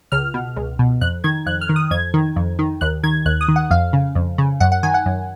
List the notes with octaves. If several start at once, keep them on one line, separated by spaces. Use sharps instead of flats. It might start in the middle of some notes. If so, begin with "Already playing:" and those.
C#2 F6
B2
C#2
B2
F2 F#6
D#3 G#6
F2 F#6
F6
D#3
D#6
F2 G#6
D#3
F2
D#3
D#2 F#6
D#3 G#6
D#2 F#6
D#6
D#3
F#5
F2 F5
C#3
F2
C#3
F#2 F#5
F#5
D#3 G#5
F#5
F#2